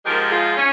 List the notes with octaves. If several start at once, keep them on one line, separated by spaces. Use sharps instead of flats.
G#2 F3 G#3 G4 A#4
F4 G#4
C#4